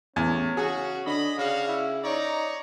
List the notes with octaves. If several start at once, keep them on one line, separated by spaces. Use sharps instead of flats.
A1 E2 C#4
C#3 F#4 G#4
D3 D#5 B5
C#3 C#4 D4 F#4 F5
E4
D#4 C#5 D5 A#5